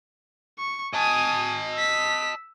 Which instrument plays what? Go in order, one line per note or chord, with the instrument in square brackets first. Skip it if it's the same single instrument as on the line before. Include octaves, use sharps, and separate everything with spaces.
[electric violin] C#6
[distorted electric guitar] D#5 A5 [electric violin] G#5 D#6
[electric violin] E6 B6